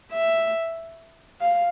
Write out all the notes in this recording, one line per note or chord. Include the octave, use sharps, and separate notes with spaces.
E5
F5